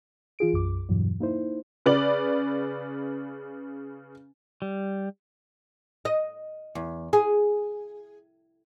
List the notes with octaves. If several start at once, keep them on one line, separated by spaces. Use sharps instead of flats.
E3 F4 G#4 D7
B1 F#2 D6
E2 G2 B2 E3 F#3
A#3 D#4 E4 C5
C#3 B4 D5 F#7
G3
D#5
E2
G#4